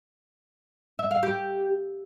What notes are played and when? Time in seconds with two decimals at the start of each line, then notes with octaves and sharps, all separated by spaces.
0.99 E5
1.11 F5
1.23 G4